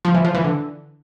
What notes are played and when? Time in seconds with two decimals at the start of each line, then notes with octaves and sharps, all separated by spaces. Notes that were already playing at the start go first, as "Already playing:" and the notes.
0.05 F3
0.15 E3
0.25 F3
0.35 E3
0.45 D3